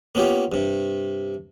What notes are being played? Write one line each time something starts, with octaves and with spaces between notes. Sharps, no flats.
A#3 B3 C#4 F4 G4
G2 C3